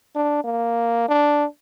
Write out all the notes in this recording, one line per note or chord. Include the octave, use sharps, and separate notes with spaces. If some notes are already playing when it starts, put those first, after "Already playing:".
D4
A#3
D4